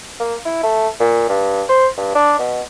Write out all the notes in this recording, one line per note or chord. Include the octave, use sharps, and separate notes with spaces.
A#3
E4
A3
A#2
G2
C5
G2
D4
B2